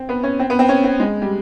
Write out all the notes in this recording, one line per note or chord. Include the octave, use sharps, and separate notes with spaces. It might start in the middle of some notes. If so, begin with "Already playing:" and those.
Already playing: C4
B3
C#4
C4
B3
C4
C#4
C4
G#3
G3